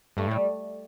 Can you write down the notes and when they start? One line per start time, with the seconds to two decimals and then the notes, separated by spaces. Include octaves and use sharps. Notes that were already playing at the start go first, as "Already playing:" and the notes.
0.17 G2 A3
0.28 A2 G3